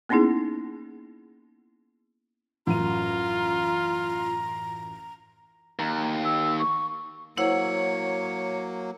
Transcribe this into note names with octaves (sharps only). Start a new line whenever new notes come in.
A#3 B3 C#4 D#4 E4 G#4
A1 F#2 F4 A#5 D#7
D#2 A#5
E6
C#6
F#3 A#3 E4 C5 C#5 F#5